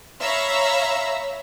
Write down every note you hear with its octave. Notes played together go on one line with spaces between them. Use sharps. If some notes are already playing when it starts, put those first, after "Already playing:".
C#5 E5 F5 A#5 B5 E6